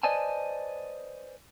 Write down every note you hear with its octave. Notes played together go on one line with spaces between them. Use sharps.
B4 C5 D5 D#5 G#5 A5